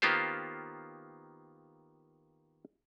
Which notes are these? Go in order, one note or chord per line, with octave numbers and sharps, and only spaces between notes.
D#3 A#3 B3 F4 G4 C5